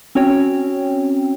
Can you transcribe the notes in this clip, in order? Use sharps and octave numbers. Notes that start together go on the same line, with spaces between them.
C4 C#4 F#4 C#5 G5